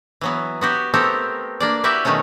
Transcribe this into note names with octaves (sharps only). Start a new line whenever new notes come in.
E3 F#3 B3
B3 F#4 G4
A3 B3 C4 G4 A4 A#4
A#3 D4 D5
E4 F#4 G4 B4 D5 E5
B2 D#3 F#3 A3 C#4